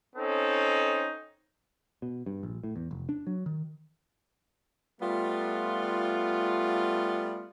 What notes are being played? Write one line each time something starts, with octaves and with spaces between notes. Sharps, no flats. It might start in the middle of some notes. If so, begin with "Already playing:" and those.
C4 C#4 D#4 A4
B2
G2
A#1
A2
E2
F1
D4
F#3
D#3
G3 A3 B3 F4